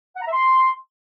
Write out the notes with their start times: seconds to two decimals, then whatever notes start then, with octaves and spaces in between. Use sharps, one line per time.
0.16 F#5
0.22 A#5
0.27 E5
0.33 C6